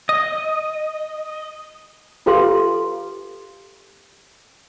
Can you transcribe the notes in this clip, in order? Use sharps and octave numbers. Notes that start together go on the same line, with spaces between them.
D#5
F4 G4 A4 B4 F5 C6